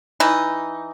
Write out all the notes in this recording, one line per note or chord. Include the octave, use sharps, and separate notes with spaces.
E3 D#4